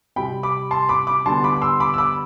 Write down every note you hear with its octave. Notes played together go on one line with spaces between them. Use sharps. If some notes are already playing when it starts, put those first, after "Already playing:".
C3 G3 C4 G5 B5
B5 D6
A5 C6
B5 D6
B5 D6
D3 G3 B3 A5 C6
B5 D6
D6
C6 E6
B5 D6
E6
B5 D6